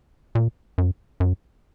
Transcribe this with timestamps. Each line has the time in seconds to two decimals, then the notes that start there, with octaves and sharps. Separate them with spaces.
0.35 A#2
0.78 F#2
1.20 F#2